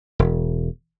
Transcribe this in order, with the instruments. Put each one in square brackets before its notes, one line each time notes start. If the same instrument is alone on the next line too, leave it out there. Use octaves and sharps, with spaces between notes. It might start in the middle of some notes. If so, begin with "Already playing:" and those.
[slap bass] E1